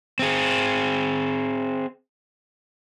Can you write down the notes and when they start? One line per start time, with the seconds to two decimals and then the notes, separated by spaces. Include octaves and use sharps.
0.19 C4 G#4